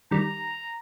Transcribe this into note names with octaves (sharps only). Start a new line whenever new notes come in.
D#3 G3 A#5